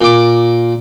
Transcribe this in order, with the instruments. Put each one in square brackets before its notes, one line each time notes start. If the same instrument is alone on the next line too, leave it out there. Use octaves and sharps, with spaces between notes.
[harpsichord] A#2 D6